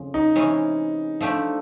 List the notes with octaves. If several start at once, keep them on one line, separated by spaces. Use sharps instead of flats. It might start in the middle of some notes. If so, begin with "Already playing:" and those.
Already playing: F2 C#3
D#4
C3 E3 G#3 C#4
F3 A3 D4 G4